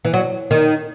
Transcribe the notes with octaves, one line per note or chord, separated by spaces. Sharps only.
E3
F#3
D#3